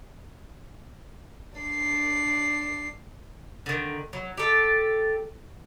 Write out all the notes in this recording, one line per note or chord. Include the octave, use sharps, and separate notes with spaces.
D4 C7
D3 D#3
F#3
G4 A4